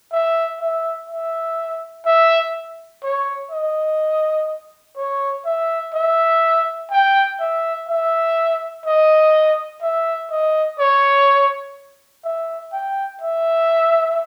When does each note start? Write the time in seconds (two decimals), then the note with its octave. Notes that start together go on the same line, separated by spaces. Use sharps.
0.12 E5
0.61 E5
1.10 E5
2.06 E5
3.04 C#5
3.51 D#5
4.97 C#5
5.45 E5
5.94 E5
6.91 G5
7.40 E5
7.88 E5
8.86 D#5
9.82 E5
10.31 D#5
10.79 C#5
12.24 E5
12.73 G5
13.21 E5